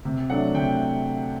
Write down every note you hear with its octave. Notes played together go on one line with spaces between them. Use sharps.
C3
F#3 A3 D4 F#5
C3 G5